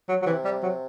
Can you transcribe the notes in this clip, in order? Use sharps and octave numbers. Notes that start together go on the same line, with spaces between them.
F#3
F#3
C3 E3
G3
F#3